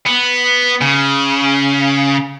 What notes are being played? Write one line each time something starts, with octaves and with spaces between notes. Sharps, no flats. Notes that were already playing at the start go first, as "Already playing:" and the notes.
B3
C#3